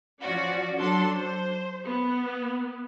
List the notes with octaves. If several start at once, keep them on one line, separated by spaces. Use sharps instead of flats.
F3 C#4 F#4 D5
F#3 D4 A4 C6
C5
B3